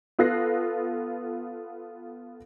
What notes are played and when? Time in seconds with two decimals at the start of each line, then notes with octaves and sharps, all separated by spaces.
0.19 B3 F4 A4 F#6 A#6 C7